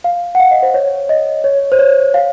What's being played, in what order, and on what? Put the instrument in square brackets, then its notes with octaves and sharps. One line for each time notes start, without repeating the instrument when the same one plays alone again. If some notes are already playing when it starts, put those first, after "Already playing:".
[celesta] F5
F#5
F5
D#5
C5
C#5
D#5
C#5
C5
C#5
F5